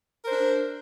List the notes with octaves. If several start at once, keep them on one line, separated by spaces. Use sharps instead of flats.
D4 A#4 C5